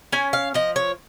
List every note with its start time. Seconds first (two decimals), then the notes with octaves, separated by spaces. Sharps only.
0.12 C#4 G#5
0.33 F5
0.54 F3 D#5
0.76 C#5